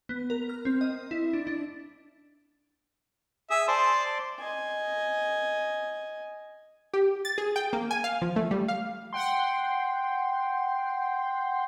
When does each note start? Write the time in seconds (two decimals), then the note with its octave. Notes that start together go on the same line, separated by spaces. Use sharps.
0.09 B3
0.30 A#4
0.50 F6
0.65 C4
0.81 D#5
1.11 E4
1.33 D4
1.47 D4
3.50 G#4 E5 D#6
3.68 C5 D5 A5 C6 D6
4.40 D#5 G#5
6.94 G4
7.25 A6
7.38 G#4
7.56 G5
7.73 A#3
7.91 G#5
8.04 F5
8.22 F3
8.36 A3
8.51 G3
8.68 F5
9.13 F#5 G5 C6